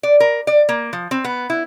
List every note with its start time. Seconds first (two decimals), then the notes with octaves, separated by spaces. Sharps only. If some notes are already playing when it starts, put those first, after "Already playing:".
0.03 D5
0.20 A#4
0.47 D5
0.69 A#3
0.93 F3
1.11 C4
1.25 B3
1.50 E4